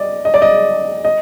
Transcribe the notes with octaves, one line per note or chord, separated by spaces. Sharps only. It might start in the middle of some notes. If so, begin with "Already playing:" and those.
Already playing: D5 D#5
D#5
D5
D#5
D#5